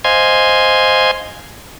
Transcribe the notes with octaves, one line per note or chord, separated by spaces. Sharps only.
C5 D#5 F5 G#5 C6 G#6